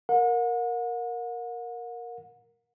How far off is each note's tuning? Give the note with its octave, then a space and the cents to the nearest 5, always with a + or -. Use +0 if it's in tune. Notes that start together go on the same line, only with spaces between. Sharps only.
A#4 +0 F#5 -40